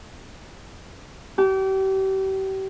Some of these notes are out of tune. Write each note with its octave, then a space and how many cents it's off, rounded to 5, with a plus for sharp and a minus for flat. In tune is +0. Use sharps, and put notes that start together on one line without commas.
G4 -35